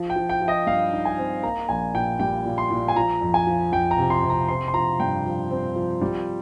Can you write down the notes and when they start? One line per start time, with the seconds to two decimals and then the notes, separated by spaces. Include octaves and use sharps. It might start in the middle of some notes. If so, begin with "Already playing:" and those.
Already playing: F3
0.10 G5
0.16 F3
0.29 G5
0.42 F3
0.48 D#5
0.67 G2 F5
0.93 D#4
1.05 G#5
1.18 C4
1.43 A#3 A#5
1.69 A#1 G#5
1.94 A#2 G5
2.19 G3 G5
2.45 A#2
2.58 C6
2.71 A#2
2.88 G#5
2.96 F3 A#5
3.21 F2
3.34 G#5
3.47 F3
3.72 F2 G5
3.91 A#5
3.98 C3
4.10 C6
4.23 C3
4.30 A#5
4.48 C4 C6
4.68 C6
4.74 F3 A#5
5.00 G2 G5
5.25 F3
5.51 C4
5.76 F3
6.01 G3